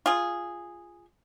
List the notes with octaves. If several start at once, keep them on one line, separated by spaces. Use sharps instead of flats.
F4 G#4